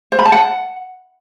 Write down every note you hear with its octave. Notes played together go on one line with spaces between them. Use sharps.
C5
B5
A5
F#5